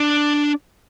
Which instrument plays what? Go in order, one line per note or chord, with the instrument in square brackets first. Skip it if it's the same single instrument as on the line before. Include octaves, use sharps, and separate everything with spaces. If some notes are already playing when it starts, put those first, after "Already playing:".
Already playing: [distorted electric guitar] D4